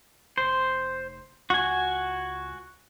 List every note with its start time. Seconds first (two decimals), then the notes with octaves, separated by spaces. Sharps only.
0.38 F1 C5
1.50 C#2 F#4 G#5